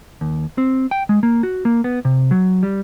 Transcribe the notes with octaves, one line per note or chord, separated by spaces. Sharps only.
D#2
C4
G5
G#3
A#3
F#4
A#3
B3
C3
F#3
G3